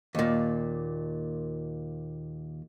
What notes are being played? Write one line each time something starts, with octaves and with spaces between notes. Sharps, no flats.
D#2 A#2